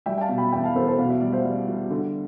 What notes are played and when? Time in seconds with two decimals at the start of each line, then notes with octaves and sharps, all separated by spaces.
0.06 G3 E5 G5
0.18 G5
0.21 F5 A5
0.29 B2
0.38 G5 B5
0.52 E2 E5 G5
0.64 F5 A5
0.75 E2 A4 C5
0.88 A4 C5
0.98 B2 F5
1.10 E5
1.21 G3 D5
1.32 C5 E5
1.44 G3
1.68 G3
1.90 D3